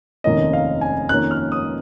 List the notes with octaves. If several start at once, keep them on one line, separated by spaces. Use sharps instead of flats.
F1 D#2 D#3 A#3 C#4 D#5
F5
G#5
F2 D#3 A#3 C#4 F#6
F6
D#6